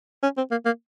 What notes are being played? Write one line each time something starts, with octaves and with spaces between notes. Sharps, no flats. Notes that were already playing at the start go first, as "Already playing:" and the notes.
C#4
C4
A#3
A#3